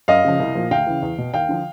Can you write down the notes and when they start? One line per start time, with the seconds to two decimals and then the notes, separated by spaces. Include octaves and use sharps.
0.08 F#2 D#5 F5
0.25 C#3 F3
0.40 C2
0.55 A#2 F3
0.71 D2 F5 G5
0.87 C#3 E3
1.02 E2
1.18 B2
1.33 D#2 F5 G5
1.49 D3 F3